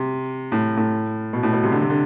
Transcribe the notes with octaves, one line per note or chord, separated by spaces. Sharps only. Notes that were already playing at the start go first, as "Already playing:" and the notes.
Already playing: C3
A2
A2
B2
A2
B2
C3
D3
C3
D3